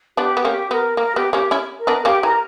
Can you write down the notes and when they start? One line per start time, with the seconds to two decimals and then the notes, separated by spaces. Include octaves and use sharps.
0.17 B3 D4 G4
0.37 B3
0.44 A#3 C#4 G4
0.71 B3 A#4
0.97 A#3 A#4
1.16 B3 G4
1.33 A#3 C#4 G4
1.51 C#4 E4
1.78 A#4
1.87 B3 D4
2.05 A#3 C#4 G4 G5
2.23 E3 A#4 A#5